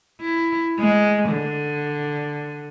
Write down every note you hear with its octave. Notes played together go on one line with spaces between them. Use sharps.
E4
G#3
D3